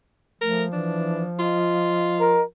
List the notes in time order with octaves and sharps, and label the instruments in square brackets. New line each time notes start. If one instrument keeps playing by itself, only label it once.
[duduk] F3 [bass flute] A3 [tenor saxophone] A#4
[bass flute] E3 [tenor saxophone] D4
[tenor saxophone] F4 [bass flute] D#5
[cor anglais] A#4